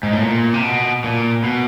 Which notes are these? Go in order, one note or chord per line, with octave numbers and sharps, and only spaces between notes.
G#2
A2
A#2
C3
B2
A#2
B2